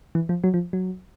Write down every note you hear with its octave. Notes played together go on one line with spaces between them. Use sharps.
E3
F3
F#3
F3
F#3